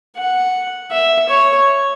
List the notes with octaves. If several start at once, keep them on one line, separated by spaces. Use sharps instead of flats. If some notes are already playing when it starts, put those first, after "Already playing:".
F#5
E5
C#5